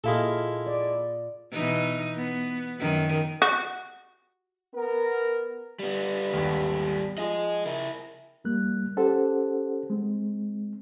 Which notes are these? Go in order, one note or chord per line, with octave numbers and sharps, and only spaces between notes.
A#2 G#3 E4 A4 F5
D5
B2 E3 D#4
B3
F#2 D#3
F#4
B3 A#4
G3 B3
G#1 D#2
F3 G#4 D#5
E4 A#4
F2 G3 A#3 F#6
C#4 G4 A4 C5 F#5
G#3 C4